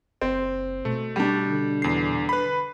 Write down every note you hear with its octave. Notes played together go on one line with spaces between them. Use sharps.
F#1 C4
B2 A3
G3 D4
D3
E2 C7
B4 B5